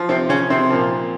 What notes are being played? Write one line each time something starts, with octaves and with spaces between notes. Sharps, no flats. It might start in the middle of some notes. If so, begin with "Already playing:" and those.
Already playing: F3
C3 C4
C#3 C#4
C3 C4
A#2 F3